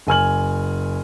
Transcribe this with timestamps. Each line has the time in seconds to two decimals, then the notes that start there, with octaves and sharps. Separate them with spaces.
0.07 F#1 G#5 F6 F#7